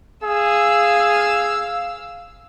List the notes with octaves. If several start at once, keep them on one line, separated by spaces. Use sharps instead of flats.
G#4 F5 E6